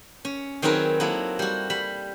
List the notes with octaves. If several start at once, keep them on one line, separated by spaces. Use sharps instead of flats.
C#4
D#3 F#3 C4 G#4 A#4 B4
F#3 A#3 E4 A4 D#5
G3 F#4
G3 B5